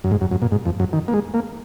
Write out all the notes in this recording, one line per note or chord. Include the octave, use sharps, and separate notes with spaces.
F#2
G#2
F#2
F#2
A#2
G#2
F2
F#2
D#3
A#3
G#3
A#3